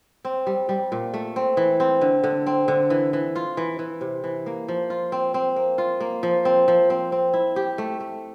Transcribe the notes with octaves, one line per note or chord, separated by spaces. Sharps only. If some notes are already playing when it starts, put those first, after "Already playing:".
C4
G3
G3
A#2
A3
C4
E3
C4
D3
D3
C4
D3
E3
E3
F4
E3
E3
C3
E3
A#3
F3
F4
C4
C4
A#3
F4
A#3
F3
C4
F3
C4
C4
E4
G4
A3
A3